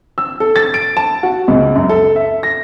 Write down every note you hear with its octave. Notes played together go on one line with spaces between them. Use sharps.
E6
A4
A6
D7
A5
F#4
C#2
F#2
A4
E5
A#6